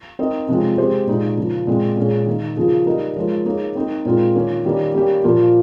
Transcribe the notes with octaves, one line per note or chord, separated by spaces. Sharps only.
C4 D#4 A#4 D#5
C3 F3 G#3 C#4
G#3 C4 G4 C5
A#2 G#3 D#4
C#3 F3 A#3
A#2 G#3 C4
A#2 G#3 C#4 G#4
D#3 A#3 D#4
C#3 F3 A#3 F4 G#4
G3 A#3 D#4 A#4 D#5
F3 G#3 D#4 A#4 C#5
A#3 D#4 G#4 C#5
C4 D#4 A#4
A#2 G#3 C4 F4 A#4
D#3 A#3 C#4 F4
D#3 G3 A#3 C#4
G3 A#3 C#4 G4
A#2 F3 A#3 F4